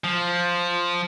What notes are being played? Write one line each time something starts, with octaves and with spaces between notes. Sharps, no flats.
F3